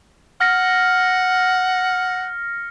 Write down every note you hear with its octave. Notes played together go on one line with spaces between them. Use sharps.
F#5 F6 A#6 C#7